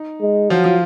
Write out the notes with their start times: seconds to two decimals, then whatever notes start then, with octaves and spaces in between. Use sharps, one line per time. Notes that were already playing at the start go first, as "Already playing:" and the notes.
Already playing: D#4
0.21 G#3
0.50 F3 F#3 F4
0.64 F3 F4